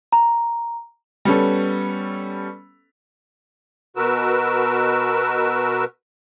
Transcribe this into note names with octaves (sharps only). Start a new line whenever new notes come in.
A#5
G3 B3 C#4 A4
B2 F#4 A#4 B4 E6